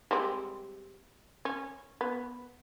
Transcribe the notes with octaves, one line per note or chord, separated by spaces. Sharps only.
G3 G#3 C4
C#4
B3